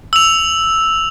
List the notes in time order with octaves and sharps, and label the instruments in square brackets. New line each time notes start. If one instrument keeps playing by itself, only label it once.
[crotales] E6 F7